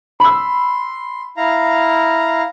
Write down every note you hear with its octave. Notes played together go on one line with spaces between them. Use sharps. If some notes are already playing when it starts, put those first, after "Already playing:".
B5 C6 E6
E4 F5 A#5